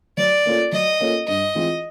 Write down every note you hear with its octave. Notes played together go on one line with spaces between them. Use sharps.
F#3 D5
A#3 C#4 F4 A4
F#3 D#5
A#3 C#4 F4 A4
G2 D#5
E3 G#3 C4 F4